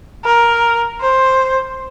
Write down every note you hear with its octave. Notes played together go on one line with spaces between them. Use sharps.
A#4
C5